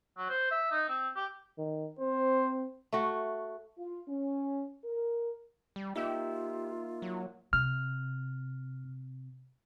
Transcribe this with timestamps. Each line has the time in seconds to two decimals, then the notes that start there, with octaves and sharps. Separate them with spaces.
0.18 F#3
0.30 C5
0.51 E5
0.72 D#4
0.89 C4
1.16 G4
1.58 D#3
1.99 C4 C5
2.93 A3 F#4
3.78 F4
4.08 C#4
4.84 A#4
5.76 G3
5.96 A#3 D#4 F4 G4 E5 E6
7.02 F#3
7.53 C3 F6